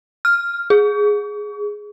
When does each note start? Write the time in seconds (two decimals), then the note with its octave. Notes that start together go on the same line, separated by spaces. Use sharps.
0.25 F6
0.70 G#4